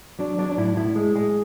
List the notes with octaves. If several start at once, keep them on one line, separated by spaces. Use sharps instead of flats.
F#3 D4
F#3 D4
D4
A2 E4
A2 E4
G#3
G#3